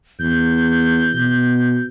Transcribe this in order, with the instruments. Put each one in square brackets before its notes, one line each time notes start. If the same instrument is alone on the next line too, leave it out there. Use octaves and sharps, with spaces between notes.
[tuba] E2 [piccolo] G6
[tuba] B2